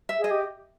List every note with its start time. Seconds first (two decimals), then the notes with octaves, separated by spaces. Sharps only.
0.09 E5
0.19 G#4
0.24 D#5
0.31 G4